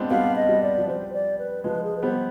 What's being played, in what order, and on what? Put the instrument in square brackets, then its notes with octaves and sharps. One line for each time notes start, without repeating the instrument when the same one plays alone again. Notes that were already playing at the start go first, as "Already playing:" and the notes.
Already playing: [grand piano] G#3 B3 C4 D4 F4
[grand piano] G3 B3 [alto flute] F5
[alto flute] D#5
[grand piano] G3
[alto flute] D5
[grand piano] F3
[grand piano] G3 [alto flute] C5
[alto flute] D5
B4
[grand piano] F3 G#3 [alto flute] B4
[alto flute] G#4
B4
[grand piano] G3 B3 [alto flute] C5